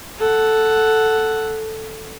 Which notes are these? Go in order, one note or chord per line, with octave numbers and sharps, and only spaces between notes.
A4 F#5